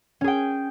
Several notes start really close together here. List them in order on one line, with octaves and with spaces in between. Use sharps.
C#4 G#4 G5